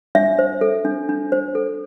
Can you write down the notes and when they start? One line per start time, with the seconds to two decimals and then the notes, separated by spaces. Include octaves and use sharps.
0.15 D4 E5
0.39 C5
0.61 A4
0.85 D4
1.09 D4
1.32 C5
1.55 A4